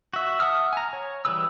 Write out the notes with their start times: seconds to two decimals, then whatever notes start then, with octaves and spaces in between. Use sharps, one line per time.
0.13 F#4 E5
0.40 E5 F#5 A5 D#6 F6
0.73 G#5 A#5
0.93 C#5
1.25 E3 G3 G#4 B4 E6